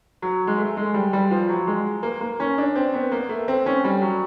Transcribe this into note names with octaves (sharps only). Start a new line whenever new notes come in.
F#3
G#3
A3
G#3
G3
G3
F3
F#3
G#3
A#3
A#3
C#4
D4
C4
B3
A#3
A3
C4
C#4
G3
F#3